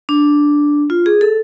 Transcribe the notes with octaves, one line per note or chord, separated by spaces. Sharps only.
D4
F4
G#4
A4